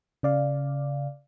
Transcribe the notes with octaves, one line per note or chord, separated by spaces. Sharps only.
C#3 D5 F5